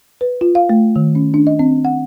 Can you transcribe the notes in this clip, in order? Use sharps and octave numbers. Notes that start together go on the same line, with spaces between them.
B4
F4
F5
A3
D#3
C#4
D4
D#5
C4
F#5